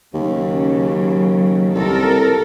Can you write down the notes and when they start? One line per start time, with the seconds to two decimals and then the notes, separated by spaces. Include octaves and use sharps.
0.14 D#2 C#3 F#3
1.75 C2 A4 A#4